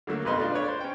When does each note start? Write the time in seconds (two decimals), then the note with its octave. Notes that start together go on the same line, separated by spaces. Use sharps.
0.07 D3 F#3 A3 A#3
0.25 B1 F2 B4 D#5 C6
0.38 A3 D4 F4
0.52 D4 B4 C#5
0.64 C5 D5
0.81 C#4 G5